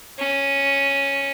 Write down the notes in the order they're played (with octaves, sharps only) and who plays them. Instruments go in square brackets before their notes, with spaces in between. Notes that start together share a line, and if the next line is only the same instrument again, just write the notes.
[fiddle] C#4